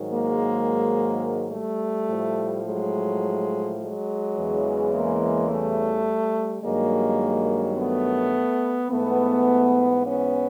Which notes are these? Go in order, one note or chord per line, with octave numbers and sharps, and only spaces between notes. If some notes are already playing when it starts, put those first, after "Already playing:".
Already playing: G#2 D#3 F#3
G#3 A#3
G3 A3
A2 F3
F#3 G#3
F#3 G#3
E2 C#3 E3
G#3 A#3
G3 A3
G2 D#3 F#3 G#3 A#3
A3 B3
G#2 E3 A3 B3
B3 C#4